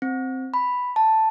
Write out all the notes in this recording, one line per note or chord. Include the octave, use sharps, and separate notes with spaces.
C4
B5
A5